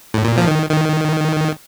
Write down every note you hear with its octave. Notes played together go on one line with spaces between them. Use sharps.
A2
A#2
F3
D#3
D#3